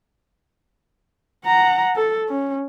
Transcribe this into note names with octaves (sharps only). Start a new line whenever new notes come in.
F#5 A#5
A4
C#4